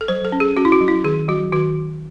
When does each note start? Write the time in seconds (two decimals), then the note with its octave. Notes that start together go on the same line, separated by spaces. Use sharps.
0.01 A4
0.08 F#3 C5
0.25 A4
0.32 C#4
0.40 G#4
0.57 C#4 F#4
0.65 E4
0.72 F#4
0.81 F#3
0.88 E4
1.04 D#3 G#4
1.28 F#3 F#4
1.52 D#3 F#4